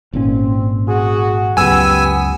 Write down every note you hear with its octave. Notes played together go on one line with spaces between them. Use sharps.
G#1 A#2 C4 C#4
F#4 G#4
C#2 F#2 B3 G4 G#5 E6